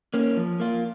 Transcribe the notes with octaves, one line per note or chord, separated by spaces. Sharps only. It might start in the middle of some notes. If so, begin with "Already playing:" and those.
A#3 C#4
F3
A#3 F4